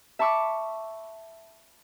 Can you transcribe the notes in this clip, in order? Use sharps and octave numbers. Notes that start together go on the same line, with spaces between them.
E5 A5 B5 C#6 D6 E6